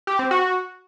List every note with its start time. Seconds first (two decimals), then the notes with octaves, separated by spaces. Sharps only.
0.07 G4
0.19 C4
0.31 F#4